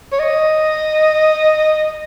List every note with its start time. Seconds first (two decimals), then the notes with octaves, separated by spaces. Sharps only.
0.12 C#5
0.19 D#5